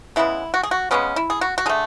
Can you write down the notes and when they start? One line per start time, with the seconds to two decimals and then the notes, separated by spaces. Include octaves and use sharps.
0.16 C#3 G#3 B3 E4
0.54 F#4
0.63 G#4
0.71 F#4
0.91 C#3 G#3 B3 C#4
1.16 E4
1.30 G#4
1.41 F#4
1.58 F#4
1.66 D3 A3 G#4